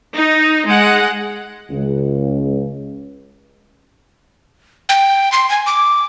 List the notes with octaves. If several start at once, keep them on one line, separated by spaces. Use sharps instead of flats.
D#4
G#3 F#5
C#2
G5
C6
G#5
D6